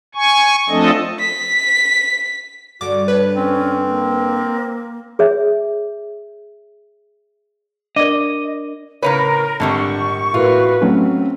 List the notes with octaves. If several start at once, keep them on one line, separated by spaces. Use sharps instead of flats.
G#5 C#6
F3 A3 C4 D4 A4 D#5
B6
G2 D3 F#4 D6
B4 C#5
C4 C#4
A#3
G#4 C#5 E5
D4 A#4 D5 D#5 D6
A2 C#3 A#4 B4 C#5
G#1 A#2 D3 G3 A5 C#6
A2 F4 F#4 A#4 B4
F#3 A3 C4 C#4